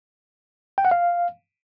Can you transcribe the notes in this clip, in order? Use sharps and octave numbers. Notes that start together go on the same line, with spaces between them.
G5
F#5
F5